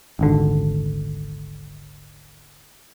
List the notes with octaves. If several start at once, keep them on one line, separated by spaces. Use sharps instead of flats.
D#1 G#1 D3